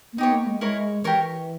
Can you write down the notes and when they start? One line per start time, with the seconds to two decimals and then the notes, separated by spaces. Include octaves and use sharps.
0.13 A#3
0.18 B3 D#4 G4 C#5
0.32 A#3
0.46 G#3
0.61 G#3 E4 A#4 C#5
1.04 E3 G4 A#4 C#5